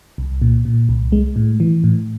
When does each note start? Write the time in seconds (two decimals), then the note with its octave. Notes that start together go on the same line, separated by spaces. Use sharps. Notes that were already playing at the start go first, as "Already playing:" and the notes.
0.18 C2
0.42 A#2
0.65 A#2
0.89 C2
1.12 G#3
1.36 A2
1.60 E3
1.84 A2